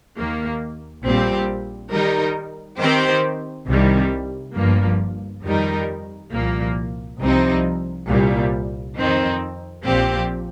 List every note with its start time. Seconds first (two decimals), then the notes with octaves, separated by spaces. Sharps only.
0.17 D#2 D#3 A#3
1.05 A#1 A#2 G3 C4 G4
1.93 D#3 G3 D#4 A#4
2.80 D#3 C4 G4 C5
3.68 C2 C3 D#3 G3
4.56 G1 G2 F3 A#3
5.45 F2 D#3 G3 D#4 A#4
6.33 C2 A#2 F3 A#3
7.21 C2 C3 F3 C4 D#4
8.09 C2 A#2 G3
8.97 F2 D#3 C4 D#4
9.85 A#1 A#2 F3 C4 G4